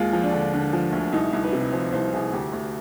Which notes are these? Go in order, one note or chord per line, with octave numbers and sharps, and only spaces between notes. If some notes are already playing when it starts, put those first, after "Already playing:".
Already playing: D#2 G#3 F4
F3
D4
D3
D3
F3
D2
C2 D#4
C2
B4
C3
F3 C5
C2 C5
C2 G#4
D2 G4
D2